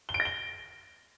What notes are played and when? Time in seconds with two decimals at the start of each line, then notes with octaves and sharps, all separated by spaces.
0.09 G7
0.14 D7
0.20 A#6
0.25 G7